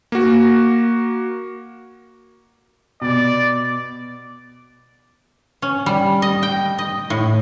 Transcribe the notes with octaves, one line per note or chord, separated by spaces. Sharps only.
A#3 F#4
B2 D5
C#4
G3
D#5
G5
D#5
A2